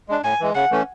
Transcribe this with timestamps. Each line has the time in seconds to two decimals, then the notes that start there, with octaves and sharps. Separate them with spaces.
0.09 G#3 D4
0.24 A2 G#5
0.40 E3 G#3
0.55 C#3 F#5
0.71 E3 A3 C#4